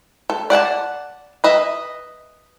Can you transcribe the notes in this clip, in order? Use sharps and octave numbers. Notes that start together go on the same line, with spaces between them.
A4
D5 F#5 G#5 A5
B4 D#5 E5